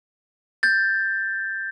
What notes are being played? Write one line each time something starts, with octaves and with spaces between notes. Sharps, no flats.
G6 A6